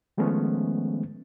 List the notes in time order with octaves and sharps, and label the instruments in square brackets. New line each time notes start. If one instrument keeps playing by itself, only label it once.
[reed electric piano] D#3 F3 G#3 A3 B3 C#4